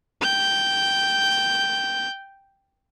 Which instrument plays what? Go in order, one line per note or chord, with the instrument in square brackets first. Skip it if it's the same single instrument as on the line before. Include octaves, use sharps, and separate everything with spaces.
[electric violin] G5 G6